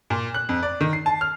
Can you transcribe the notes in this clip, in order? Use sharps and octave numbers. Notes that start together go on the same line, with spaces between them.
A#2
F#6
F2
D5
D#3
C7
A5
F6